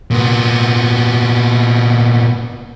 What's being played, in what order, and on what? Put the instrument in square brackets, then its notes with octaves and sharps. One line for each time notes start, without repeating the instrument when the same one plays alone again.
[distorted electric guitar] A#2 B3